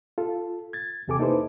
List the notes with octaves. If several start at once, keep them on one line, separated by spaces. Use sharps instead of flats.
F4 A4
G#6 A6
E2 C3 G4 A4 G#5 D6
A#3 D#4 E4 A4 B4 C5